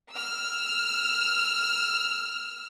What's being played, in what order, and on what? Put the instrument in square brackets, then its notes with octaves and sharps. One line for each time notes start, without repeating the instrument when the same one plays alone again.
[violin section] E6 F6